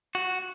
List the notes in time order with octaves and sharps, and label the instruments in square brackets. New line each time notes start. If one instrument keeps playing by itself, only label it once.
[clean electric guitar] F#4